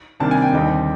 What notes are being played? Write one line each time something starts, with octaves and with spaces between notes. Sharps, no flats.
C3 D#3 G3 A#3 D4 A5
G#5
G5
D#2 D3 G3 C4 D#4